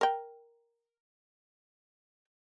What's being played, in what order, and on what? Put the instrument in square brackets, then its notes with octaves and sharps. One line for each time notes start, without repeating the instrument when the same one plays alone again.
[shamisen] A#4 G5